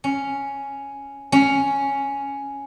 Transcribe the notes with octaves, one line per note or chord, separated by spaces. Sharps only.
C#4
C#4